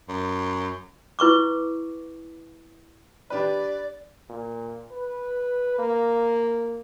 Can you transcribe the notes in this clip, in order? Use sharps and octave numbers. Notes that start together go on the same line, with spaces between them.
F#2
E4 B4 C#6 D6
D4 G4 B4 D5
A#2
B4
A#3